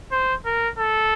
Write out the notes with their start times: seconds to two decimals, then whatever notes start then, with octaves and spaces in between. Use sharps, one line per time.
0.12 C5
0.46 A#4
0.78 A4